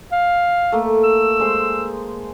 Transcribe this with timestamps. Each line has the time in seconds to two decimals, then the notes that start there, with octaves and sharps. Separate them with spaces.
0.12 F5
0.72 A3 A#3
1.04 E6
1.40 G#3 C5